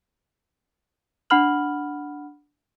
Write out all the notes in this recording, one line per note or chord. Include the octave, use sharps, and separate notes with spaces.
D4 F#5 B5 F6 F#7